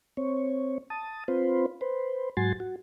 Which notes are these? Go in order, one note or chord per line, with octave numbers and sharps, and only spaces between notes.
C4 C#5
A5 D#6
C4 F4 B4 C5
B4 C5
G#2 F#3 F#4 G#5 C6 A6
F#4